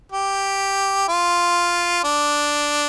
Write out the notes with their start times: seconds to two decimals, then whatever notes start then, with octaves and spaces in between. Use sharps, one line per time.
0.12 G4
1.08 F4
2.04 D4